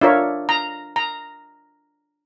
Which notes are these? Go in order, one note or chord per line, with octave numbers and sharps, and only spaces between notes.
D4 F4 A#4 C#5 E5
A#5
A#5